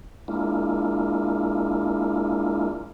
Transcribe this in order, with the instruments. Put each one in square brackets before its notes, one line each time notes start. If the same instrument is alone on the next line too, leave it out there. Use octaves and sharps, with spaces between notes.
[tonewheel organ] G#3 A#3 D4 E4 F4